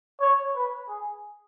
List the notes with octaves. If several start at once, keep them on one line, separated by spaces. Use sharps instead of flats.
C#5
B4
G#4